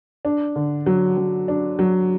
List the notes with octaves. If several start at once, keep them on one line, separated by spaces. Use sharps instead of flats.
D4
D3
F#3
F#3
D4
F#3